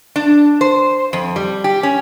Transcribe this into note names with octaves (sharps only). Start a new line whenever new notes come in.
D4
C5
F2
G3
G4
C#4